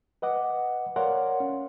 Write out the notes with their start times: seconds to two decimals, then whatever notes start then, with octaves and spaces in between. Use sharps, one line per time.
0.22 B4 D#5 F#5 D6
0.96 A#4 C#5 D5 F5 F#5 C6
1.40 C#4